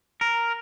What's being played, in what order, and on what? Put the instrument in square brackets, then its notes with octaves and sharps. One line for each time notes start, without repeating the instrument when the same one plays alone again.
[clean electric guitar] A#4